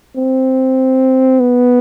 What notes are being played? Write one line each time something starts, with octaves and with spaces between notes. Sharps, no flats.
C4
B3